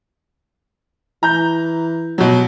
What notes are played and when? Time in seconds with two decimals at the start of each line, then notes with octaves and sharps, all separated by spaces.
1.23 E3 A#5 G6
2.18 B2 F#3